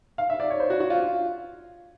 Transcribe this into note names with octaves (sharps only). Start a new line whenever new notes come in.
F5
E5
D5
C#5
C5
F#4
F#4
F4